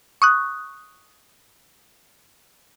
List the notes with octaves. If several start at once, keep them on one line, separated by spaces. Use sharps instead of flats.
C#6 D#6 F#6